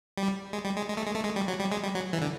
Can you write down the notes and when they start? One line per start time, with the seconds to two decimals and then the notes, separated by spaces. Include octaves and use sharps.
0.18 G3
0.53 G#3
0.65 G3
0.77 G#3
0.89 G#3
0.97 A3
1.06 G#3
1.15 A3
1.24 G#3
1.36 G3
1.48 F#3
1.60 G3
1.72 G#3
1.83 G3
1.95 F#3
2.13 E3
2.22 D3